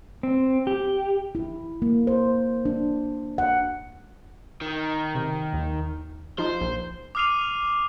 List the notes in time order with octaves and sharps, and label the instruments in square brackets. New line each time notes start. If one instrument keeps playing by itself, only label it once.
[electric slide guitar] C4
G4
[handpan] E4
A#3
C5
D4
F#5
[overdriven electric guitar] D#3
[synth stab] C3
D#2
[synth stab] F3 D#4 [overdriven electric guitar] C5
[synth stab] A#1
[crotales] D6 D#6 F6 C7 D#7 F7